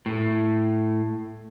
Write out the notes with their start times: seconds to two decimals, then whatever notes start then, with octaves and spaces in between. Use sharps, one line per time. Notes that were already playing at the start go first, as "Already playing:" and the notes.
0.06 A2